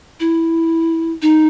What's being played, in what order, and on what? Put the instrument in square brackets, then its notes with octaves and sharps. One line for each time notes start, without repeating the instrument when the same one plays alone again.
[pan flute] E4
D#4